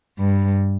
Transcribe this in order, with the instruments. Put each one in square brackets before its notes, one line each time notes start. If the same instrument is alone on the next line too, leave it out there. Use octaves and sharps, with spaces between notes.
[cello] G2